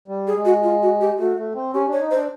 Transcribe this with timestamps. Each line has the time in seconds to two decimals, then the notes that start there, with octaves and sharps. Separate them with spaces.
0.08 G3
0.27 G#4
0.36 G#3
0.45 F#4
0.63 F4
0.82 F#4
1.01 G4
1.19 A3 F#4
1.37 A3
1.55 C4
1.74 C#4 G4
1.88 D4 C#5
2.01 D#4
2.11 C5
2.15 D4